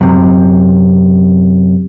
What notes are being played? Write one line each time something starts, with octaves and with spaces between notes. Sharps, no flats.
F#2 C3